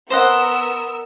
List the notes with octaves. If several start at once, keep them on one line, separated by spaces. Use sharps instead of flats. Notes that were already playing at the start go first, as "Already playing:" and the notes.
B3 A#4 C5 D#5 F#5 E6